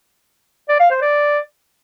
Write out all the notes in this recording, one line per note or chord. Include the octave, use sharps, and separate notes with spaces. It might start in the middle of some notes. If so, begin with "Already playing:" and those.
D5
F5
C5
D5